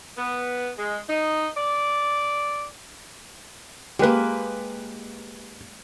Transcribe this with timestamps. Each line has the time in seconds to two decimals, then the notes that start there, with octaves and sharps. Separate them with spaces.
0.18 B3
0.79 G#3
1.09 D#4
1.57 D5
3.99 G#3 A#3 G4 B4